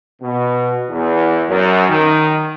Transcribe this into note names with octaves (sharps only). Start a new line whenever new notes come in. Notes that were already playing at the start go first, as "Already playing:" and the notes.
B2
E2
F#2
D#3